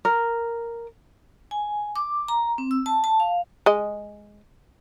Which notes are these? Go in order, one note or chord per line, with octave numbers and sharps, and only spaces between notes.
A#4
G#5
D6
A#5
C4
E6
A5
A5
F5
G#3 D#5